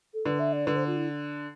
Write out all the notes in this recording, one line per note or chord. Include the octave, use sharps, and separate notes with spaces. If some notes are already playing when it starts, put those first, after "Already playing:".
A4
D3 B4
E5
D5
D3 B4
C5
F4
E4